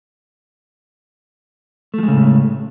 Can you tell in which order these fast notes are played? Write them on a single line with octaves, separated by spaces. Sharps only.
A3 F3 G#3 C#3 A2